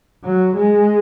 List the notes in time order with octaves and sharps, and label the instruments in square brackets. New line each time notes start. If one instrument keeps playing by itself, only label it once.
[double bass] F#3
G#3